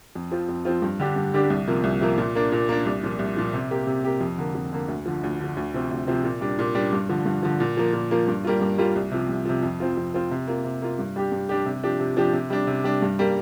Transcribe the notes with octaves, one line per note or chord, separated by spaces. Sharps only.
F2
F3 C4 F4
F2
F3 C4 F4
G2
D3 G3 D4 G4
G2
D3 G3 D4 G4
C2
C3 F3 A#3
C2
C3 F3 A#3
A#2
A#3 D4
A#2
A#3 D4
C2
A#2 F3
C2
A#2 F3
C3
A#3 G4
C3
A#3 G4
F2
D3 A#3
F2
D3 A#3
D2
D3 F3
D2
D3 F3
D2
C3 F3 C4
D2
C3 F3 C4
A#2
G3 D4
A#2
G3 D4
G2
D3 F3
G2
D3 F3
A#2
F3 A#3
A#2
F3 A#3
G2
G3 A#3 F4
G2
G3 A#3 F4
C2
C3 F3
C2
C3 F3
F2
F3 C4 F4
F2
F3 C4 F4
C3
A#3 F4
C3
A#3 F4
G2
G3 D4 G4
G2
G3 D4 G4
C3
F3 D4 G4
C3
F3 D4 G4
C3
G3 D4
C3
G3 D4
G2
G3 A#3